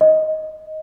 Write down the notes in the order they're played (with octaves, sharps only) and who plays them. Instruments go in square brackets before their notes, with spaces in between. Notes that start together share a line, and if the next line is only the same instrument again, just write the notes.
[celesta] D#5